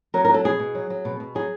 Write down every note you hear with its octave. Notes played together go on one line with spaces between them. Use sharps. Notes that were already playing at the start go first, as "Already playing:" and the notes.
F#3 A#4
A#4
F#3 A4
B2 G#4
B2
F#3
F#3
B2
B2
F#3 G#4